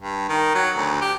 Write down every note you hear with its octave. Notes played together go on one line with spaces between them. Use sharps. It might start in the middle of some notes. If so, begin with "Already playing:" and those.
G2
D#3
F#3
D2
G4